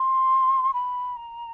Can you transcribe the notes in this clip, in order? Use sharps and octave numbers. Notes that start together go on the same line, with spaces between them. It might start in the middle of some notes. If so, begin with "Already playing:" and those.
Already playing: C6
B5
A#5